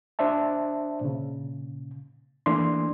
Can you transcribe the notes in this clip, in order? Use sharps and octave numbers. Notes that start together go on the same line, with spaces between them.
D4 C5 D5 E5 A5
A#2 C#3
E3 A3 A#3 D4 D5 C6